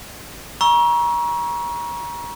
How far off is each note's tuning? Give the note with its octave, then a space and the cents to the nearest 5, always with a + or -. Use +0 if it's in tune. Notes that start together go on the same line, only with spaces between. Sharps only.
A#5 +35 C#6 +0 E6 +0